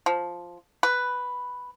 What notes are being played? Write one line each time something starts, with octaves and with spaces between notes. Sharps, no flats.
F3
B4